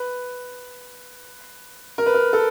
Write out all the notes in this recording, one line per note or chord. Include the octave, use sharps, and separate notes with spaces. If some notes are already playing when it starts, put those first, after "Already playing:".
Already playing: B4
A#4
B4
A#4
A4